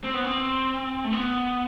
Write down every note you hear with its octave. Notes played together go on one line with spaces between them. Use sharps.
C4
B3
C4
A3
B3